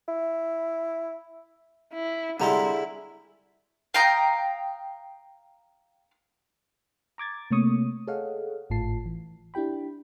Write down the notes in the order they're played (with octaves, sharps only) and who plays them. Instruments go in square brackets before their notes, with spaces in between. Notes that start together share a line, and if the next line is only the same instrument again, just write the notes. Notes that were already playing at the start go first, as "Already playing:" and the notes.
[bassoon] E4
[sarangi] E4
[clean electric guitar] C2 A#5 C6 [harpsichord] D3 G3 G#3 [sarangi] E4
[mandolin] F5 G5 A#5 D#6
[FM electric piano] A#5 D6 G#6 A6
C3 A3 A#3 C#5 C#6 D#6
G#4 A4 C#5 D#5 F5 F#5
G#1 A2 A3 F4 A5 C7
E3
D4 E4 G4 G5 B5